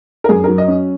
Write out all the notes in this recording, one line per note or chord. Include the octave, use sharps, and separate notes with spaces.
A#4
F#2 G#4
F#3 A#4
D#5
C#4